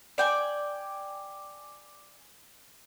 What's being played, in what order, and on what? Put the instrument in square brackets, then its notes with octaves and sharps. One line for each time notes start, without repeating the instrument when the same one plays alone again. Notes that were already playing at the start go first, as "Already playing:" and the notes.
[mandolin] D5 G5 G#5